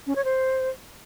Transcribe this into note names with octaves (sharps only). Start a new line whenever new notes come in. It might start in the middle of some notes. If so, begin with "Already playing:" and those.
C#4
C#5
C5